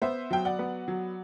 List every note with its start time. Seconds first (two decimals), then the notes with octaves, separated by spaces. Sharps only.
0.02 B3 C5 E5
0.31 F#3 G5
0.45 D5 F#5
0.59 B3
0.88 F#3